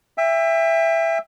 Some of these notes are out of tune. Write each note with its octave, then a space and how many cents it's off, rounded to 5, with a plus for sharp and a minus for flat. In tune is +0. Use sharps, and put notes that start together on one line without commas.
E5 +10 G5 +35